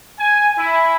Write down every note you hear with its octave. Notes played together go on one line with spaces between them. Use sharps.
G#5
E4